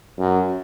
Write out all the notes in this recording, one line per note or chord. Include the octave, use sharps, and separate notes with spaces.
F#2